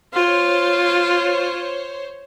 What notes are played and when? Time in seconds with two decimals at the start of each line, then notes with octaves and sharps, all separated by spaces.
0.14 F4 C5 C#5